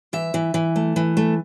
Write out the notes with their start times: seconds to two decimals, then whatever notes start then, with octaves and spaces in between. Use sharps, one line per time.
0.13 E3 E5
0.34 E3
0.54 E3
0.76 A3
0.96 E3
1.17 A3